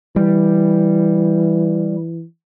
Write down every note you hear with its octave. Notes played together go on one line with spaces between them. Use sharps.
E3 G3